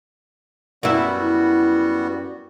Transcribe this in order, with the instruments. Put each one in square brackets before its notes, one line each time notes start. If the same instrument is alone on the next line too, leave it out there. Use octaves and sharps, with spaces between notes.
[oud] F#2 E4 [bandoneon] G3 B3 F#4